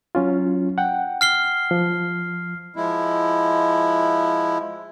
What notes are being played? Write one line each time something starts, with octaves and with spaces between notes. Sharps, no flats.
F#3 C#4 F4
F#5 G5
F6 C7 G7
F3
F3 G#3 E4